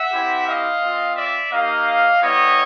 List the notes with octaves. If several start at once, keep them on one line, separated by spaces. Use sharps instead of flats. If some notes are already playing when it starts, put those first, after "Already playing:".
Already playing: E5 F#5
C4 E4 G4
D#5 F5
C4 F4
D5 E5
A#3 D#4 G4 D#5 F5
G3 B3 E4 G4 C#5 D#5